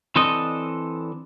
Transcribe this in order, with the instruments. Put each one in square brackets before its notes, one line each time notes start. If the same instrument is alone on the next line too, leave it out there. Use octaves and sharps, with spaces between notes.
[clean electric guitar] E3 C4 D4 A4 D#5